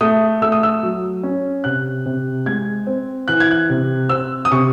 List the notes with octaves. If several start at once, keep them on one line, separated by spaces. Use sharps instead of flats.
A3 D#6
A3 E6
D#6
E6
F#3
C#4
C3 F#6
C3
G#3 G#6
C4
E3 F#6
G#6
F#6
C3
C4 E6
D#6
C3 C#6